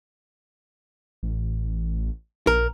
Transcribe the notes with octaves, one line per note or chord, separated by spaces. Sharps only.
A1
A#1 A#4